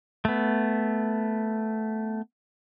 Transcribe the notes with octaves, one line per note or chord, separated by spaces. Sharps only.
A3 B3